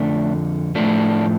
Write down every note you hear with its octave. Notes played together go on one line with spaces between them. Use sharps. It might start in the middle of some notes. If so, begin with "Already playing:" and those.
Already playing: F2 D3 F3 A3 D4
A2 F3 A3 D4